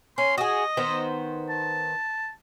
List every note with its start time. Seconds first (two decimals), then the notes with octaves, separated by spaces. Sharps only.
0.18 C#4 C6
0.38 F#4 G#4 D#5
0.77 D#3 B3 C5
1.49 A5